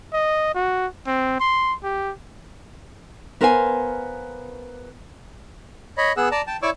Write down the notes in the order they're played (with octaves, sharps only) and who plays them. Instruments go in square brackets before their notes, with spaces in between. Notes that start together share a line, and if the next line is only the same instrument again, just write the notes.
[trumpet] D#5
F#4
C4
C6
G4
[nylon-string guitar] B3 A#4 C5 F5 F#5 G#5
[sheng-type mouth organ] C#5 D#5 B5
B3 G#4 F#5 E6
D5 A5 A#5
G5 A5
E4 C#5 D5 C#6 D6 E6